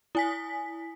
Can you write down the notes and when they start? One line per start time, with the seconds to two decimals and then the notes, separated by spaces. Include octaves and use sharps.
0.15 E4 G#5 B6